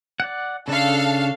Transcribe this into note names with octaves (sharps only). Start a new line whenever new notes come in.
D5 F#5
C#3 D4 A4 F5